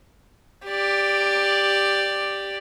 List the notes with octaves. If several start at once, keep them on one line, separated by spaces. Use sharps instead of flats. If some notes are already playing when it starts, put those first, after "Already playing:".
G4 D5